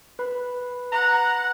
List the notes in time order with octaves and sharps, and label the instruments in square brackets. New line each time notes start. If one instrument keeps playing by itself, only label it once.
[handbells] B4 B5
[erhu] F#5 [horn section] A#5